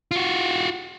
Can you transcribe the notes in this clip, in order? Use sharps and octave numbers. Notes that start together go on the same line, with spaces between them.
F4 F#4